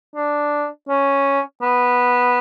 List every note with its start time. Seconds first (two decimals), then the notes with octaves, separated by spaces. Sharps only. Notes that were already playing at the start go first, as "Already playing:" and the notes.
0.15 D4
0.89 C#4
1.62 B3